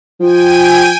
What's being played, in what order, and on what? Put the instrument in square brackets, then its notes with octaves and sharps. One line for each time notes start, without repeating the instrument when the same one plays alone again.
[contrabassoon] F3 [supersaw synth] G5 G#5 D#7